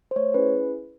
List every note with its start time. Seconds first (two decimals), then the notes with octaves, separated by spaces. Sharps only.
0.11 C5
0.16 A3 C#5
0.34 C#4 E4 G#4 B4